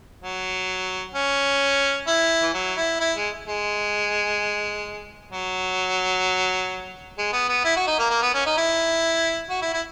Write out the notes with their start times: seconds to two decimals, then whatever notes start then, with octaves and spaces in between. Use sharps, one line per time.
0.21 F#3
1.15 C#4
2.07 E4
2.42 E3
2.54 F#3
2.77 E4
3.00 E4
3.16 G#3
3.47 G#3
5.32 F#3
7.18 G#3
7.33 B3
7.49 B3
7.64 E4
7.76 F#4
7.87 D#4
7.99 A#3
8.10 A#3
8.22 B3
8.34 C#4
8.46 D#4
8.57 E4
9.50 F#4
9.62 E4
9.73 E4